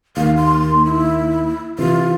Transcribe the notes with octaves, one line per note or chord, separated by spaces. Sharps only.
D#2 F5
C6
E4
C3 E3 F4